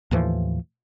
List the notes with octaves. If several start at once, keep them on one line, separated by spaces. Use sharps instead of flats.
D#2 A2 E3 F3